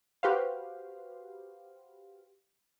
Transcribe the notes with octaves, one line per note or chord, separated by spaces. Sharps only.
F#4 G4 B4 C5 F5